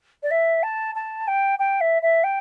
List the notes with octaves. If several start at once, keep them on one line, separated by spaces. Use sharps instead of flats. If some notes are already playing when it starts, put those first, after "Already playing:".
D5
E5
A5
A5
G5
G5
E5
E5
G5